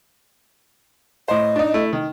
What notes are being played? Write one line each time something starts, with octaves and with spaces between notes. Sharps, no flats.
A2 C5 D#5
D4 D#4
A3 E4
D#3